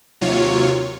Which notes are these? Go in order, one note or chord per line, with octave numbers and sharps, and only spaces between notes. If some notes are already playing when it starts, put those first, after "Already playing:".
D#2 C3 F#3 F4 C#5